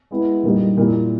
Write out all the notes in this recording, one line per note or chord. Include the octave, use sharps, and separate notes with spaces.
G#3 B3 E4
A#2 G3 A#3 D#4 G4
A#2 A#3 E4 G4